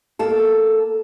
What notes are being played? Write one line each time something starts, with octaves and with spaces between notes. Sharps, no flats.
A#3 A4